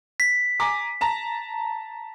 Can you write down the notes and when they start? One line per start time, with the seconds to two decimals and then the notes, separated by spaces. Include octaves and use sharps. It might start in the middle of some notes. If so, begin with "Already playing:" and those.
0.20 B6
0.60 G#5 A#5 D6
1.01 A5 A#5